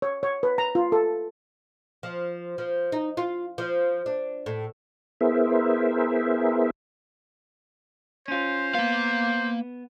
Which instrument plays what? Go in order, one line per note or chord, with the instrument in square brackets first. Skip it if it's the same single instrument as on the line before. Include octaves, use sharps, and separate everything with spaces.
[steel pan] C#5
C#5
B4
A#5
F4
A4
[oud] F3
F3
D#4
F4
F3
D4
A2
[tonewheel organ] B3 E4 G#4 A#4 C5 E5
[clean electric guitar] C#4 F4 [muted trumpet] C5
[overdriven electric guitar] A#3 F5 [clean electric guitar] B3